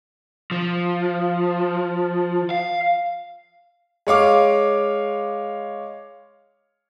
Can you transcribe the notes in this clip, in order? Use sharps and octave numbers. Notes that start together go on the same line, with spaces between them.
F3
F5
G#3 C#5 F5 D6